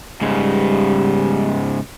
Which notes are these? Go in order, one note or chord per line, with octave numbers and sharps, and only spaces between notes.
G#2 C#3 G3